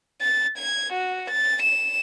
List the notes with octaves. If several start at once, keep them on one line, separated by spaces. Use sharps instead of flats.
A6
G#6
F#4
A6
E7